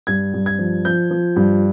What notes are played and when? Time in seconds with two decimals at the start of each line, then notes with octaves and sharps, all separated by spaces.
0.07 G2 G#6
0.34 G2
0.46 G#6
0.59 F3
0.85 F3 G6
1.11 F3
1.36 G2